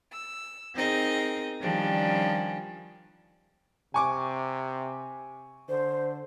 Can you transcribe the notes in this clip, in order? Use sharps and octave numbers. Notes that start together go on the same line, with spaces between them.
E6
C4 D#4 G#4 A#4 D#5
D#3 F3 G3 C#4 D4
C3 G#5 C#6 D6
D3 C5